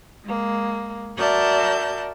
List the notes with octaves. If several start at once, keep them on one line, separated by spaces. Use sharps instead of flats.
G#3 A#3
F#4 A#4 D5 E5 A5 G6